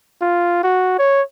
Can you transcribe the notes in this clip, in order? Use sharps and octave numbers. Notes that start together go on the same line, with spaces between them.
F4
F#4
C#5